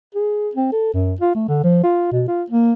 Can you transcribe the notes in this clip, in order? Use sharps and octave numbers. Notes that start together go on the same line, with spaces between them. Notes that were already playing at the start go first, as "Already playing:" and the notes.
G#4
C4
A4
F#2
F4
A3
D3
F3
F4
B2
F4
A#3